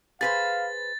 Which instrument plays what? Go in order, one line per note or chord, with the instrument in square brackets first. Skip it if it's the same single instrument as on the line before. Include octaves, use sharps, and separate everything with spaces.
[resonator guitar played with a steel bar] G#4 B4 C5 [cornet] F5 [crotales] A6